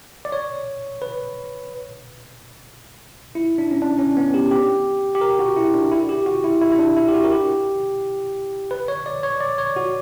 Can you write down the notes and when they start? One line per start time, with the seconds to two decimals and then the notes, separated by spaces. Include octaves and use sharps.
0.25 D5
0.32 C#5
1.02 B4
3.35 E4
3.58 D4
3.71 C#4
3.82 D4
3.99 C#4
4.17 B3
4.34 G4
4.51 G4
5.15 G4
5.21 A#4
5.39 F#4
5.57 E4
5.74 D4
5.91 E4
6.09 G4
6.26 F#4
6.44 E4
6.62 E4
6.72 E4
6.79 D4
6.97 E4
7.08 G4
7.14 F#4
7.24 A#4
7.31 G4
8.71 B4
8.88 C#5
9.06 D5
9.23 C#5
9.41 D5
9.58 C#5
9.76 F#4